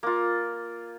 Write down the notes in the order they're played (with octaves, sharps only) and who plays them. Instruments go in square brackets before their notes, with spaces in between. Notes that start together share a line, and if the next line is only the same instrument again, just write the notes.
[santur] A#3 F4